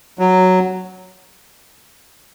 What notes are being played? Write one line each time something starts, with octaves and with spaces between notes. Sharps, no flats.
F#3